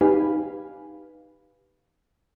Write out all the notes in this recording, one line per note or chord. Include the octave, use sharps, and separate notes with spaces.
D#4 G4 B4 F5 G#5 B5